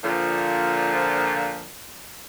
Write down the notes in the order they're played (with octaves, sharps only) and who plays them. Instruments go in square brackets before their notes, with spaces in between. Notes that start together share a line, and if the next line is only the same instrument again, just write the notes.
[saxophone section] A#2 D3 F3